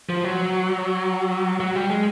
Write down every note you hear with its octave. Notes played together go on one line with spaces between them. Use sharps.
F3
F#3
F#3
G3
G#3